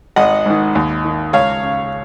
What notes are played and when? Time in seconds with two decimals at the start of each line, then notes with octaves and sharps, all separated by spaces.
0.16 G#1 D#5 F#5
0.46 G#2 D#3
0.75 D#2
1.05 D#3
1.33 C#2 C#5 F5
1.63 C#3